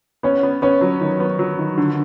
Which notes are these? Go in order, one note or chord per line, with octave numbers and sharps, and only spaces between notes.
B3 C#4
B3
B3 C#4
F#3
D#3
B3
F#3
D#3
D3